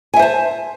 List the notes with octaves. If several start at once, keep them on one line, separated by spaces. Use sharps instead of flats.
C5 E5 G#5 A5